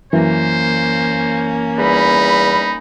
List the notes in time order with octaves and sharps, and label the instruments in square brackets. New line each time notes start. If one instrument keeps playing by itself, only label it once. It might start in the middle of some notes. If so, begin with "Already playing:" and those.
[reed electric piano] F#2 E3 [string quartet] A#3 C#4 [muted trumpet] C5
[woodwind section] E2 G3 B5 [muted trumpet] D#4